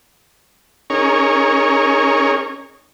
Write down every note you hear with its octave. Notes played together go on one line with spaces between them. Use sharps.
C#4 D#4 G#4 A#4 C#5